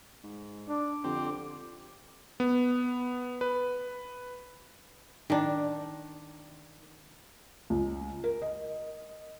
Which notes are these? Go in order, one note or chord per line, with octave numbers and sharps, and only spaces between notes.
G#2
D4 D6
F2 D3 C4 G4
B3
B4
D#3 D4
C#2
A#4
D#5